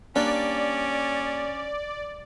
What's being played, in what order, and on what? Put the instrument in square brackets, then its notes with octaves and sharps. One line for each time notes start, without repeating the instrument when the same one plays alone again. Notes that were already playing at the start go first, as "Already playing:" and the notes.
[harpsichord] G3 A#3 [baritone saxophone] C#4 [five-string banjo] D4 [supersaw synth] D5